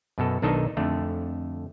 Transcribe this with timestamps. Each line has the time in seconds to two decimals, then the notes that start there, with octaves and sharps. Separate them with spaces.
0.18 F#2 B2 A4
0.42 B1 D#3 D4 D#4 A4 D#5
0.77 F2 D3 A3